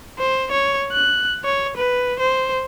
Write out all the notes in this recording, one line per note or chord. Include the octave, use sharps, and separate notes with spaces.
C5
C#5
F#6
C#5
B4
C5